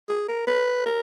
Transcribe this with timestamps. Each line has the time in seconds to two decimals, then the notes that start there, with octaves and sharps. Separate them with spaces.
0.09 G#4
0.28 A#4
0.47 B4
0.86 A#4